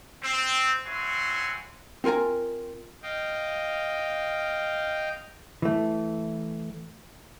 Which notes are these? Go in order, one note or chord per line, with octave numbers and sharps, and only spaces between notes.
C4
C4 E4 F#4 C#5 G#5 C6
C4 F4 A#4 G#5 A#5
D#5 F5 G5
E3 A3